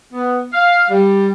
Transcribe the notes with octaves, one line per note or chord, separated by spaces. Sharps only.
B3
F5
G3